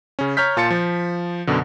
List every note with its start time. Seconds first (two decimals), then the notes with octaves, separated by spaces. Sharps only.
0.19 C#3 C#4
0.37 C#5 A#5 F6 G6 B6
0.57 A#2 F4 A5 A6 C#7
0.70 F3
1.47 F#2 B2 D3